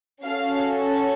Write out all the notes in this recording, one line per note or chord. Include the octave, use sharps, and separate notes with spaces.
C#4 F#4 A4 F5